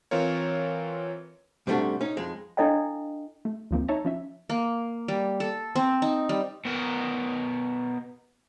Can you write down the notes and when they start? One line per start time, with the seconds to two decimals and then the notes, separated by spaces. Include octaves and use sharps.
0.11 E3 C4 F4 A#4 C#5
1.67 G#2 C3 G3 A3 D4 F#4
2.01 C#4 D#4
2.17 F2 G#3
2.57 D4 E4 A4 D#5 F5 G5
3.45 A3
3.71 D2 F3 A#3 C4
3.88 D#4 C#5 E5 A5 A#5
4.05 F3 C#4 E5
4.50 A#3
5.08 G3
5.40 A4
5.76 C4
6.02 D#4
6.29 G3
6.65 B2 A#4